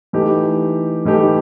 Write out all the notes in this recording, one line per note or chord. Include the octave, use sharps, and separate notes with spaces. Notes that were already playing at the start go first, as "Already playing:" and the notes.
E3 A3 D#4 G4
E3 A3 D#4 G4